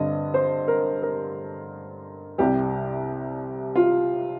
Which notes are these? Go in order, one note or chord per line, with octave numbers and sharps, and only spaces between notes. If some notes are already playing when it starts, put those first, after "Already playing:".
Already playing: G2 D3 G3 C4 D#5
C5
A#4
A#4
C2 C3 G3 G4
F4